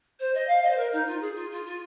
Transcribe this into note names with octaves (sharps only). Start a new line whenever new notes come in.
C5
D#5
F5
D#5
C5
A#4
D#4
F4
G#4
F4
F4
F4